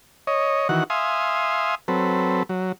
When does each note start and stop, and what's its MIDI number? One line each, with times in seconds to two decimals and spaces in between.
0.27 0.68 73
0.27 0.68 75
0.69 0.84 51
0.69 0.84 52
0.69 0.84 66
0.69 0.84 78
0.90 1.75 76
0.90 1.75 77
0.90 1.75 80
0.90 1.75 84
0.90 1.75 87
1.88 2.43 54
1.88 2.43 60
1.88 2.43 69
1.88 2.43 71
2.49 2.72 54